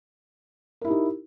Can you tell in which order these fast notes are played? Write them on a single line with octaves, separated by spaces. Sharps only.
A#4 E4 G4 D#4